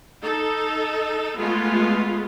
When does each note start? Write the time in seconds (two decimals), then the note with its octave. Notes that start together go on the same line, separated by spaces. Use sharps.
0.22 D#4 A4
1.38 G#3 A3 B3 F4